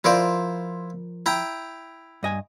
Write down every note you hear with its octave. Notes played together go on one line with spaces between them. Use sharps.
F3 E4 F4 A#4 C5 D5
E4 G5 A#5
G2 D#5 G#5